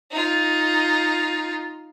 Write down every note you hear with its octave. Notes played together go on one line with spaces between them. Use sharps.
D#4 F4